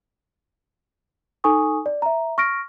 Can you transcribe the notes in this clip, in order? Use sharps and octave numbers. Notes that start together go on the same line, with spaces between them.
D#4 A4 G#5 C#6 D#6
D5
E5 A#5
C#6 F6 A#6 D7